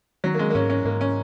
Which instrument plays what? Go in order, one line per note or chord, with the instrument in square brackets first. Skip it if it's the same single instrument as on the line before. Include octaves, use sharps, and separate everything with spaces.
[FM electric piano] D#3 [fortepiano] F#3
[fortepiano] A#3
G#3
A#3
[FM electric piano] G#2 [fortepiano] C#4
[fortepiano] C#4
[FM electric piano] G#2 [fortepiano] A#3
[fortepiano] C#4